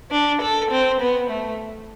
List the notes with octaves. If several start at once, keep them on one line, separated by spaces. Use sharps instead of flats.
D4
A4
C4
B3
A3